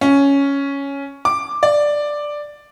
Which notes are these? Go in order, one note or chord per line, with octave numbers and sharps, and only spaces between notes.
C#4
D6
D5